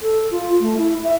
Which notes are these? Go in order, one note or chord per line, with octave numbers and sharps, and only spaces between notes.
A4
F4
A3
E4
E5